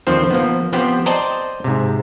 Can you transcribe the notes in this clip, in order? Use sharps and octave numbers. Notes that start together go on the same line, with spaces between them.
D#2 D3 D#3 F3 C4 C5
F3 A#3 B3
F3 B3 C4 G4 C5
C5 D5 D#5 G5 A5 A#5
G#2 C3